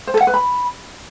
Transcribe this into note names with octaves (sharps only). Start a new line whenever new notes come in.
C5
A4
F#5
B4
B5